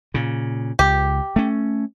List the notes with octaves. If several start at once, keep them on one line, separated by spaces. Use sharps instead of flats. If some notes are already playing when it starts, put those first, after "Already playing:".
A#2 C#3
C#2 G4
A3 C#4